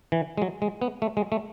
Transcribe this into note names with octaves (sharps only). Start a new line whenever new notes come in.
E3
G#3
F#3
G#3
B3
A3
G#3
A3